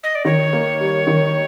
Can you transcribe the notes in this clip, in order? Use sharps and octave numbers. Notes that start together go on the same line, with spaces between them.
D#5
D5
D#3 C#5
A#3
G3
D#3